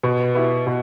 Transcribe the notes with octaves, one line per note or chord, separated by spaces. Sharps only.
B2
B3 E4 G4
B2